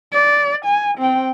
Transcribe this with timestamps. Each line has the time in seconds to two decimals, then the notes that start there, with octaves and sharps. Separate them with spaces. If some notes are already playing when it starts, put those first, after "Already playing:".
0.12 D5
0.65 G#5
0.98 C4 G5